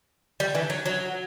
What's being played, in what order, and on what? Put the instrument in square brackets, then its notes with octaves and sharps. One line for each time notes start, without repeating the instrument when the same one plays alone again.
[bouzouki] G3
E3
F#3
F#3